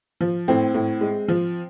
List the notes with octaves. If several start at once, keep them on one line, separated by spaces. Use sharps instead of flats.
F3
A2 C4
A2
G#3
F3